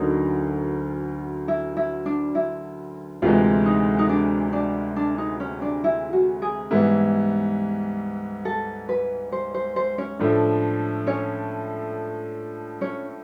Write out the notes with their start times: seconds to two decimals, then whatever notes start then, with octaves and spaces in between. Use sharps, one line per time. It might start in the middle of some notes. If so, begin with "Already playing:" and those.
Already playing: D2 D3 F#3 A#3 C#4 D#4
1.48 E4
1.77 E4
2.06 D4
2.35 E4
3.22 D2 C3 E3 G#3 F4
3.66 D#4
3.99 D#4
4.09 D4
4.53 D4
4.96 D4
5.18 D#4
5.40 C#4
5.62 D4
5.84 E4
6.13 F#4
6.42 G#4
6.71 G#2 E3 G3 B3 E4
8.45 A4
8.89 B4
9.32 C5
9.54 C5
9.76 C5
9.98 C#4 C#5
10.20 A2 F3 A3 D4
11.07 C#4 C#5
12.81 C#4 C#5